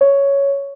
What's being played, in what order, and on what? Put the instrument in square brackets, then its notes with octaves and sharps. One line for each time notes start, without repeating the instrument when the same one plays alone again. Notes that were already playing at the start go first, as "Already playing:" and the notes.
[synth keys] C#5